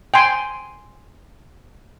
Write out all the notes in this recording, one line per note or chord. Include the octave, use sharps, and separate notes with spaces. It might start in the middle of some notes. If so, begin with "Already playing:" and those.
G5 G#5 C6